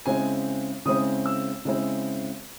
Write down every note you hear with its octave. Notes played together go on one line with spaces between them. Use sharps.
C#3 G#3 C4 E4 G#5
C#3 G#3 C4 E4 D#6
E6
C#3 G#3 C4 E4